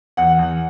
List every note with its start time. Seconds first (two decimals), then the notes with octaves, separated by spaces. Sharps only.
0.17 E2 F#5
0.39 E2